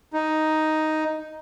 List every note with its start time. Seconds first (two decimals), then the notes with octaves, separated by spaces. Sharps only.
0.13 D#4